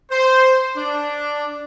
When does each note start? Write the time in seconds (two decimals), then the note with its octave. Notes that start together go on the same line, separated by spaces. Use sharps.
0.11 C5
0.76 D4